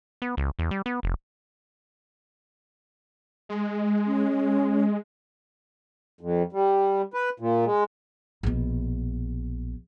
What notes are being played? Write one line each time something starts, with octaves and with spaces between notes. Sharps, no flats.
B3
C#2
E2
G3
B3
F1
G#3
C#4
F2
G3
B4
A#2
G#3
A#1 B2